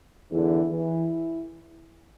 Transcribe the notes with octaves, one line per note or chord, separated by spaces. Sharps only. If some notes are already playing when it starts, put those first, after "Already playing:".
E2 D3 E3 E4
E3 E4